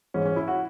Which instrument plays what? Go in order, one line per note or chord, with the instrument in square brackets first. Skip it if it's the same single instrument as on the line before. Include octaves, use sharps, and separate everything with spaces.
[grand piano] G#2 E3 G#3 C#4
C#4
E4
F#4